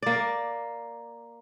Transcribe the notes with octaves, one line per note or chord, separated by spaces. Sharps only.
A#3 D5